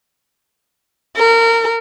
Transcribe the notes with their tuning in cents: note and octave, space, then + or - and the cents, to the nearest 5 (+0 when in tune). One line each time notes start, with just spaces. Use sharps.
A#4 -25